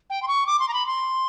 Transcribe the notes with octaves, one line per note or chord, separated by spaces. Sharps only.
G5
C6
C#6
D6
C6
A#5
B5
C6